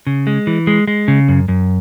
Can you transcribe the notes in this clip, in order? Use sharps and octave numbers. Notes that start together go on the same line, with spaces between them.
C#3
G#3
E3
G#3
G#3
C#3
F#2
F#2